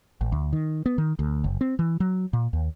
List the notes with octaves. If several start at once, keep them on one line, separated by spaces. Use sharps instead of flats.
A1
D2
D#3
B3
D#3
D2
F#1
C4
E3
F#3
A#2
D#2